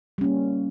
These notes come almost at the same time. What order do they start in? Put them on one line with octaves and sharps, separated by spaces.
G3 C#4 A#3